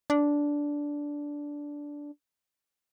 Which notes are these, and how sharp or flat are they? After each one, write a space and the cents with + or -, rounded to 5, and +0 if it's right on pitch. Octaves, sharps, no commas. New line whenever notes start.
D4 -10